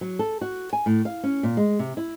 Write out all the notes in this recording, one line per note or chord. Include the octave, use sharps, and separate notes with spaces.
F#3
A4
F#4
G#5
A2
F5
C#4
A#2
G#3
C3
E4